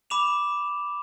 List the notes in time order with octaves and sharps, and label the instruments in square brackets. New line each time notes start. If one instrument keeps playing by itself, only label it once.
[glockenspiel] B5 D6 E7 F7